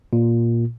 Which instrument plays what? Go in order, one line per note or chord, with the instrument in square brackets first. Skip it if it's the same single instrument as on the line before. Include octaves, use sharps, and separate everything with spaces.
[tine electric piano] A#2